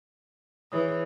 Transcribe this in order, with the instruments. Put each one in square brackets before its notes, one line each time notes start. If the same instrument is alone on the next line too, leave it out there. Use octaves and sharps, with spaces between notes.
[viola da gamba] E3 [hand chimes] G#4 C#5 D#6